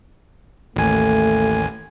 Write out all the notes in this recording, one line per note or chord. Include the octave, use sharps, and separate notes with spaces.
A1 D#2 A3 G#5